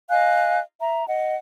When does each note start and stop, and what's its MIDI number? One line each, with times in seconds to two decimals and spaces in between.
0.10 0.58 75
0.10 0.58 77
0.10 0.58 80
0.10 0.58 90
0.80 1.05 76
0.80 1.05 82
1.07 1.36 75
1.07 1.36 78